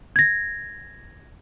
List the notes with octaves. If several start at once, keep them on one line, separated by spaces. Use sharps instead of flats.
G#6 A#6